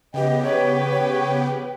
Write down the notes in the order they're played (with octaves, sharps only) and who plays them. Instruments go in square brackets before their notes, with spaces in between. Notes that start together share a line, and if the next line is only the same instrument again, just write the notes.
[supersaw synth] C#3 B3 G4 [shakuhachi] D#5 [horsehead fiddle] G5
[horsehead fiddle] B4 G5 [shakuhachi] C#5
[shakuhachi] C#5